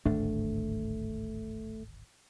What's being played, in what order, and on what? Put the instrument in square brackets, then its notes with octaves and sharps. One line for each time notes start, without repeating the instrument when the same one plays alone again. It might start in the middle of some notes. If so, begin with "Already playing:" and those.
[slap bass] D1 G#1 D4 [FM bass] A3